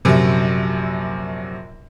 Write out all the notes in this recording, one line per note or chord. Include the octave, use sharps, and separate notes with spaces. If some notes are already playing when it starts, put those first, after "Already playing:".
A#1 F#2 C3